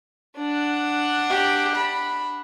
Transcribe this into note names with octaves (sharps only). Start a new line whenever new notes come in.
D4 F#5
G4
B5